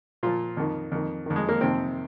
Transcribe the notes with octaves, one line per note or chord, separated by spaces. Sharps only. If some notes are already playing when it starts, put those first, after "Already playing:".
A#2 F3 F4
F2 D#3
F2 D#3
F2 D#3
G#3
A#3
F2 C3 D#3 C4